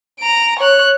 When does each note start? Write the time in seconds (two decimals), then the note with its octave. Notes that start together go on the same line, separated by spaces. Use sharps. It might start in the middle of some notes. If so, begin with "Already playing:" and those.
0.19 A#5 D7
0.59 C#5 F#6